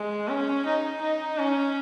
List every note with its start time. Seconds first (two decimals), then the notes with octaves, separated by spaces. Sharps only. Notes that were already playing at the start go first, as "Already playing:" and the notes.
Already playing: G#3
0.29 C#4
0.65 D#4
1.02 D#4
1.38 C#4